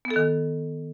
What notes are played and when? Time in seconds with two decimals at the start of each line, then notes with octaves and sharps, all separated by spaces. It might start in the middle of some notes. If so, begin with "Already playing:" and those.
0.05 B3
0.10 A4
0.16 D#3